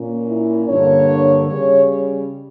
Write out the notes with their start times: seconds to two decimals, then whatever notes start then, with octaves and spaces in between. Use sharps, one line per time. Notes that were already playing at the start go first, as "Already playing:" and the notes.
Already playing: A#2 A#3 C#4
0.28 E4
0.68 G2 D3 A#3 D4 C#5
1.47 C#3 G3 C#5